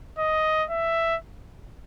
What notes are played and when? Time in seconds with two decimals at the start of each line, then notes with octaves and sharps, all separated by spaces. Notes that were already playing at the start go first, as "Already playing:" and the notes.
0.19 D#5
0.70 E5